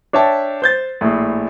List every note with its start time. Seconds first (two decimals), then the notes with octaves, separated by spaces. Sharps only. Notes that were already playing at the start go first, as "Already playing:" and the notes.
0.13 D4 C#5 E5 G5 A5
0.62 C5 G6 A6
1.01 A#1 A2